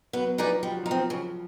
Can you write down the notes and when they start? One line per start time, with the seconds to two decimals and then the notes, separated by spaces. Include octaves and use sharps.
0.13 F#3 B3
0.38 F3 D#4 G#4 B4 D5
0.63 F3 G3
0.72 F#3
0.83 F3 D#4
0.91 C4
1.10 C#3